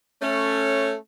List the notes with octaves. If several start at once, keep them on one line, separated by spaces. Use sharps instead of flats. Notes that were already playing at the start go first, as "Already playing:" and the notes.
A3 C#4